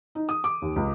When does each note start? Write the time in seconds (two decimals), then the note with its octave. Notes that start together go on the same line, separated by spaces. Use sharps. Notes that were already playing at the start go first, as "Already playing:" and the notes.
0.15 D#4
0.29 D#6
0.44 D6
0.62 D#2
0.76 C#2